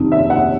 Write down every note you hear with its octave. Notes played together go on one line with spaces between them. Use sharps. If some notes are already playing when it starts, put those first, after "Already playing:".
Already playing: F2 C3 D#3 G3
E5
F#5